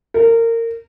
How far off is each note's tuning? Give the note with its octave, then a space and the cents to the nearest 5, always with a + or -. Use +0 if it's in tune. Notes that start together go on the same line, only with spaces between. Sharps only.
A#4 -25